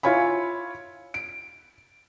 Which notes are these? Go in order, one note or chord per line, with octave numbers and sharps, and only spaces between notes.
E4 F4 C#5 G#5 B5
D7